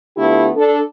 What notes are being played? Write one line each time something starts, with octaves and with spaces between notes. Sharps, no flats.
D3 A3 B3 E4 F4 G4
D4 A4